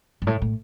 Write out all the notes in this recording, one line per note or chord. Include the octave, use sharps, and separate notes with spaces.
G2
A2
A2